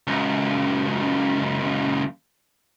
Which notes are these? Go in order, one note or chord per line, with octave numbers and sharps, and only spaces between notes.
C#2 F#2